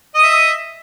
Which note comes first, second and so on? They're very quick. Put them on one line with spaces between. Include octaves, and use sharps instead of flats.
D#5 D#6 E5